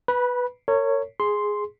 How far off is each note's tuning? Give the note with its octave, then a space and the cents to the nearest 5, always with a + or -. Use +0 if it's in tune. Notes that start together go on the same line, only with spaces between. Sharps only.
B4 +0 B5 -25
A#4 -35 C#5 +0
G#4 +0 C6 +0